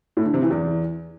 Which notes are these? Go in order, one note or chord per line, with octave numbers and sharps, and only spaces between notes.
A2
D3
C3
E3
E2